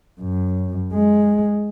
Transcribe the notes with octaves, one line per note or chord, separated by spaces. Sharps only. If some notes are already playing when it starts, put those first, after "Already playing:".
F#2
G#3